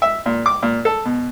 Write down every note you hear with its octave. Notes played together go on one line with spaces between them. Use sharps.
E5
A#2
D6
A#2
A4
B2